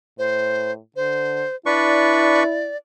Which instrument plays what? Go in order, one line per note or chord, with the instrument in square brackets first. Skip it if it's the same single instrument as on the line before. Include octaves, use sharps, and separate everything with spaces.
[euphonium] A2 [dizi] C5
[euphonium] D3 [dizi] C5
[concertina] D4 B4 C#6 [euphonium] E4 [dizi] D5